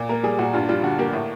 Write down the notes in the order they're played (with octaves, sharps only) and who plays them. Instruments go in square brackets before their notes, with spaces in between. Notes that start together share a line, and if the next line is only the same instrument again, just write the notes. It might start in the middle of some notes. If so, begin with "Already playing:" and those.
Already playing: [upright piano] A#2
A#3 A#4
G3 G#4
A#2 F#4
G2 F4
G3 F4
D3 F#4
A#3 G4
A2